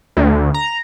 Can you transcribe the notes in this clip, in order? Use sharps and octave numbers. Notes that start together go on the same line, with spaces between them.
D2
A#5